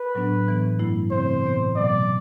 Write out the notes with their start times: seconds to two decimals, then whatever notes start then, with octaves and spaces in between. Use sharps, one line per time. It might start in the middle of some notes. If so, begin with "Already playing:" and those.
Already playing: B4
0.15 A2 F#3 B3 D4
0.47 A2 E3 B3
0.79 G2 F#3 A3 E4
1.11 C3 E3 A3 C4 C5
1.44 A2 E3 B3
1.75 B2 F#3 A3 D5